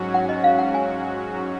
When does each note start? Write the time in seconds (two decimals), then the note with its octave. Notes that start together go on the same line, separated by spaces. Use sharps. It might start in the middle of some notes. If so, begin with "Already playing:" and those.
Already playing: G#2 F#3 C#4 F#4
0.14 F#5
0.29 D#5
0.44 F5
0.58 F#5
0.74 G#5